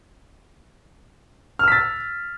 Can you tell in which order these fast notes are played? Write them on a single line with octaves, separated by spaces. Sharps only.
F6 E6 B6 A6